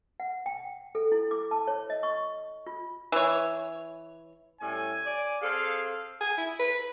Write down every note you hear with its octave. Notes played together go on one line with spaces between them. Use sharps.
F#5
G5
A4
E4
D6
A5
C#5
D#5
C#6
F4
E3 C#5
A2 G3 C#4 G#5
D5
C4 G#4 A4 F5
G#5
E4
B4